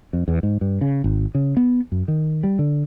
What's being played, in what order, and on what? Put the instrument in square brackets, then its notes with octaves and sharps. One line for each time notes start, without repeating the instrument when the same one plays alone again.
[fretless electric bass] F2
E2
G#2
G2
C#3
G#1
C#3
B3
F#2
D#3
G3
D3